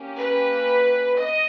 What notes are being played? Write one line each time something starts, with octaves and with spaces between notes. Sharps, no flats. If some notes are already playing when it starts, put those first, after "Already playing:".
Already playing: A#3 C#4 G4
B4
D#5